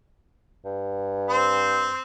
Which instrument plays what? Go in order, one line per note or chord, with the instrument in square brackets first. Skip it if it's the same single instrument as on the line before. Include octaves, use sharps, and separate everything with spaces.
[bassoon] G2
[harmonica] C4 C5